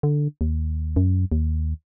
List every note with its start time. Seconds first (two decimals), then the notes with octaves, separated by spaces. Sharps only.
0.03 D3
0.41 D#2
0.96 F#2
1.32 D#2